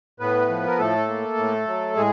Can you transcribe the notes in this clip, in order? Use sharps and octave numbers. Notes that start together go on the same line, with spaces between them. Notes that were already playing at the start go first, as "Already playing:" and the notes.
A2 B3 B4
F3
A#4
A2 A3 A4
A#3
A2
F#3
A2 G#3 G#4